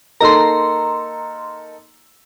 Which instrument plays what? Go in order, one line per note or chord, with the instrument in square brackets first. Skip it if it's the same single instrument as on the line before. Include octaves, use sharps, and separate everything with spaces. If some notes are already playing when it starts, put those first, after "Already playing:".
[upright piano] A#3 D#4 A4 [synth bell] A#5 C6